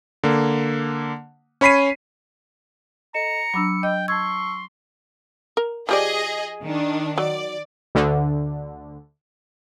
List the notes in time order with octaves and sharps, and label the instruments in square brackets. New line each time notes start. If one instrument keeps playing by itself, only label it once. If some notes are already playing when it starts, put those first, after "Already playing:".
[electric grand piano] D3 A#3
C#4 C#5 B5 B6 C7 D#7
[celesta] A4 D#5 E7 [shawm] A#5 [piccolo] C#7
[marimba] F#3 D4 [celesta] B5 D6 E6
[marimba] D#5 [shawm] G5
[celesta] A5 E6 [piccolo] C6 [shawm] C#6 [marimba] G#6
[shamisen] A#4
[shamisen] F3 G4 D5 [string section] G#4 D#5
[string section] D#3 D4
[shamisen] F#3 [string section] D5
[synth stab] D2 D3